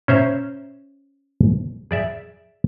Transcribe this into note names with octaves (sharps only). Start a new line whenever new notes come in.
C#4 C5 E5 A#5
G#4 D5 E5